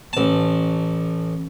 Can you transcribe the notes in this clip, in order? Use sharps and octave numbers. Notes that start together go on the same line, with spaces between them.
A1 A5